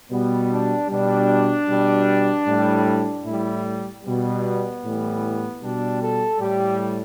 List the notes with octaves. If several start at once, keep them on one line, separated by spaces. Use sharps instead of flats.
B2 G3 B3
D4
B2 G3 D4
B2 G3
A2 G3
A2 G3 E4
B2 G3 B3
A2 E3 G3
B2 G3 D4
A4
A2 G3 G4